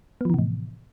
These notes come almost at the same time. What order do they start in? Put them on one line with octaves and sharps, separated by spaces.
B3 F3 E3 C3 A2